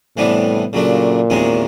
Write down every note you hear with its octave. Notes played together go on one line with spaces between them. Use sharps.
A2 C3 E3 G3 B3 D4
A#2 C#3 F#3 A3 D4
E2 C3 D#3 G#3 C#4